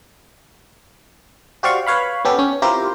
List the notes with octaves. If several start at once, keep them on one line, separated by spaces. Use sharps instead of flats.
F#4 G4 C5 D5 F5 C#6
B4 C#5 F5 B5
B3 C#4 G4 A4
C#4
C4 E4 F4 G4 A#4 C5